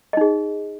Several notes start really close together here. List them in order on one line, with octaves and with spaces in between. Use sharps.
D#5 D#4 G#4